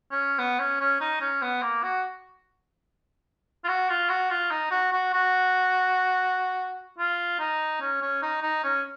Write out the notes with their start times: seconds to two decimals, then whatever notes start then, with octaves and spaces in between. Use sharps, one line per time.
0.11 C#4
0.38 B3
0.59 C#4
0.80 C#4
1.01 D#4
1.20 C#4
1.42 B3
1.62 A#3
1.83 F#4
3.64 F4
3.68 F#4
3.89 F4
4.09 F#4
4.30 F4
4.51 D#4
4.71 F#4
4.92 F#4
5.13 F#4
6.98 F4
7.39 D#4
7.81 C#4
8.01 C#4
8.22 D#4
8.42 D#4
8.64 C#4